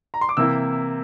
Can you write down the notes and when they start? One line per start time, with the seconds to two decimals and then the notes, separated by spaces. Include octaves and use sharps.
0.14 A#5
0.21 C6
0.29 D6
0.37 C3 E3 A#3 E4 E6